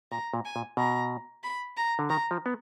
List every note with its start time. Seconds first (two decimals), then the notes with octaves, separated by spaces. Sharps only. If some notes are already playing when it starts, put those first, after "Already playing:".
0.12 A#2 A#5
0.34 A#2
0.45 G#5
0.56 A#2
0.77 B2 A#5
1.43 B5
1.77 A#5
1.99 D3
2.10 D#3 A#5
2.31 F3
2.46 B3